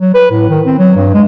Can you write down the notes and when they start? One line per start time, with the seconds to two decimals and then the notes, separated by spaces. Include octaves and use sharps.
0.01 F#3
0.14 B4
0.31 A2
0.49 D#3
0.66 C4
0.79 F#3
0.97 G2
1.14 G#3